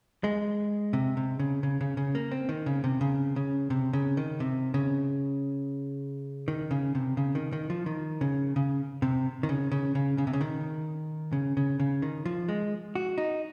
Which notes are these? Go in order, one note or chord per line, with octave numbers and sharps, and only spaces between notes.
G#3
C3
C3
C#3
C#3
C#3
C#3
A#3
C4
D#3
C#3
C3
C#3
C#3
C3
C#3
D#3
C3
C#3
D#3
C#3
C3
C#3
D#3
D#3
F3
D#3
C#3
C#3
C3
D#3
C#3
C#3
C#3
C#3
C3
C#3
D#3
C#3
C#3
C#3
D#3
F3
G#3
F#4
D#4